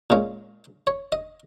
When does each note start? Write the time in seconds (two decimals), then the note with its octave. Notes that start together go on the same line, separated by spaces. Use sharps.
0.10 A#2 G#3 C#4
0.87 C#5
1.12 D#5